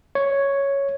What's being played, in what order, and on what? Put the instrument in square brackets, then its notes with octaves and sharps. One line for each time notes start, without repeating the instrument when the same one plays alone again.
[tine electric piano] C#5